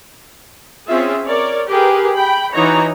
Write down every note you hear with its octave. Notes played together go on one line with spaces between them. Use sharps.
C4 C#4 F4 G#4 E5
A#4 C#5 D5
G4 G#4 A#4 B4
G5 B5
E3 D#4 F#4 C#5 A#5